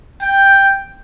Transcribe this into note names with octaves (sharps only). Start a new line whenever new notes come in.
G5